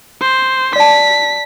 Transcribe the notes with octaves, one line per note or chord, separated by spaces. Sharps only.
C5
D5 A5 B6